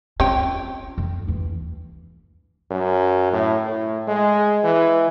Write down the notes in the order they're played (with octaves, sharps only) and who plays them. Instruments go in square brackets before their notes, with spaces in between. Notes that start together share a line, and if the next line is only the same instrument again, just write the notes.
[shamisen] C4 C#5 G5 [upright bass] C#4 F4
[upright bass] F2
D#2 E3
[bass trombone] F#2
A2
A2
G#3
E3